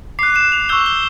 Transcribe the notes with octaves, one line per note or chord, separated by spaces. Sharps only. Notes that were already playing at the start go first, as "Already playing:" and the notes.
D6 F#6 C7
E7
F7
C#6 E6 G6 G7
G7